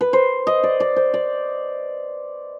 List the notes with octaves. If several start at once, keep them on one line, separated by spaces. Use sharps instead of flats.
B4
C5
D#5
D5
D5
C5
D5